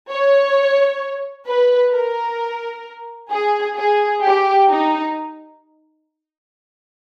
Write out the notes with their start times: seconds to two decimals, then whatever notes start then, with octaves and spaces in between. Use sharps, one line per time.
0.10 C#5
1.47 B4
1.93 A#4
3.31 G#4
3.77 G#4
4.22 G4
4.68 D#4